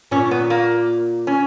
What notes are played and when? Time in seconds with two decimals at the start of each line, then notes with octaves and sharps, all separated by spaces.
0.11 A#2 C#4
0.31 B3
0.50 A#3
1.27 C#4